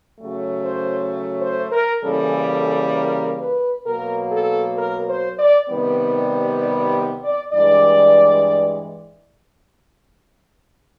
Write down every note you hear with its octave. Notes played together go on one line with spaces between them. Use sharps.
C#3 F#3 A3
C5
C5
A#4
C#3 E3 G3 A#3 A4
A4
A#4
B4
B2 F#3 A#3 A#4
A4
A#4
C5
D5
C3 D#3 G3 B3
D5
D5
D5
G2 E3 G#3 D5